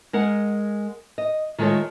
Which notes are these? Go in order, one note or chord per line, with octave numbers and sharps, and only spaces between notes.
G#3 A#4 F#5
D#5
D#3 G#3 A3 F4 A4 C#5